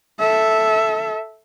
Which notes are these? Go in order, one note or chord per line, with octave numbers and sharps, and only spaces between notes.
A4 E5